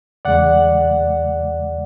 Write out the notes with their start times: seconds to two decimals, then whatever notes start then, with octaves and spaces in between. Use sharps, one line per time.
0.25 E2 C#3 G#3 D5 F#5